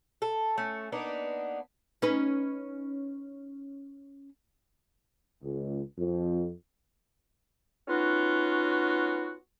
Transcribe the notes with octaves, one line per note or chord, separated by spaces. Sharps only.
A4
A3 C#4
A#3 B3 D4 D#4
C#4 D#4 B4
C#2
F2
B3 C#4 D#4 F4 F#4